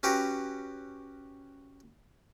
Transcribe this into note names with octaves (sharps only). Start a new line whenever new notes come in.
C#4 F#4 G4 B4 A#5